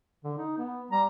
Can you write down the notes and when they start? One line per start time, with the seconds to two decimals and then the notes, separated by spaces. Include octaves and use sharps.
0.24 D3
0.37 D#4
0.58 B3
0.91 G3 A#5